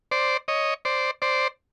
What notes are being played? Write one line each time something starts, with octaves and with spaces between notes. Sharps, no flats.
C5 D5
C#5 D#5
C5 D5
C5 D5